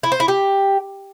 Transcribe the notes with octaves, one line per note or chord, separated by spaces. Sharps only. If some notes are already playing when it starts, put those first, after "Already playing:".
E4
C5
E4
G4